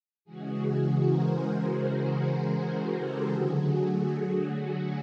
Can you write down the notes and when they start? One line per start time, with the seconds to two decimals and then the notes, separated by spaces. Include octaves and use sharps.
0.25 C#3 E3 G#3 F#4 G#4
1.01 A#4 C5
2.54 G#4 A#4
2.92 G4 A4
3.30 D3 F#3 A3 F#4 G#4